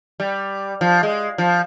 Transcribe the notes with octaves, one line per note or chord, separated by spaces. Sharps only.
G3
F3
G#3
F3